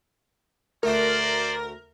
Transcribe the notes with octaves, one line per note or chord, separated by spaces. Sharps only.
D2 A3 F#4 A#4 C5 D5